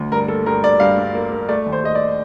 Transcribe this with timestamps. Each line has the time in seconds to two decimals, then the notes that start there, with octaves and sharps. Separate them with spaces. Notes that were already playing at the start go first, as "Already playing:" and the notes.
Already playing: D2
0.12 G2 A#4
0.28 A#3 A4
0.46 G2 A#4
0.64 G2 D5
0.80 G2 F5
0.98 G2
1.15 A#3
1.32 A#3
1.49 A3 D5
1.66 D#2
1.72 C5
1.84 A3 D#5
1.95 D5